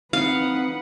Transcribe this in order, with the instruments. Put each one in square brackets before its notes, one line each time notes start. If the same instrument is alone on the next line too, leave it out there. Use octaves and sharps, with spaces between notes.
[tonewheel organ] C4 D#4 D#6 [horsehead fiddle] B4 F#5 [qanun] F5